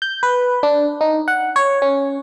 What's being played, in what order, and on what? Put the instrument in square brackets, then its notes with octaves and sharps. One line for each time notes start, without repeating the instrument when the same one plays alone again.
[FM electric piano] G6
B4
D4
D#4
F#5
C#5
C#4